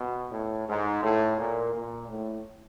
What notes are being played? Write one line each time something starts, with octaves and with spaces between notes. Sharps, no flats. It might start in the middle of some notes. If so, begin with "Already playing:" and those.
Already playing: B2
A2
G#2
A2
A#2
A#2
A2